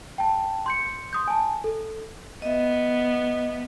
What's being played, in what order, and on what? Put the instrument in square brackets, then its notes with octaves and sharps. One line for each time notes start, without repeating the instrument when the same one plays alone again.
[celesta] G5 A5
C6 G6 C#7
C6 D#6 G6
G#5 A5
A4
[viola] B3 [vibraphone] D#5 E5